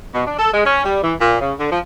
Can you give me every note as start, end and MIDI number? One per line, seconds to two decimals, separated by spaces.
0.13 0.23 47
0.25 0.38 62
0.38 0.48 69
0.53 0.61 56
0.64 0.83 61
0.84 0.99 55
1.02 1.13 52
1.20 1.35 46
1.40 1.53 49
1.58 1.70 50
1.71 1.79 53